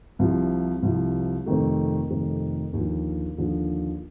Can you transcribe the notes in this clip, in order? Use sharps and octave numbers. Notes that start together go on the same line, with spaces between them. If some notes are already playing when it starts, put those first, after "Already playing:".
C2 C3 F3
C2 C3 F3
F2 C3 D#3 A3
F2 C3 D#3 A3
D#2 D3 F3
D#2 D3 F3